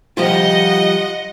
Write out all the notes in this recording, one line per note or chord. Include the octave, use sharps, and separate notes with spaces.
F3 G3 F4 D#5 F#5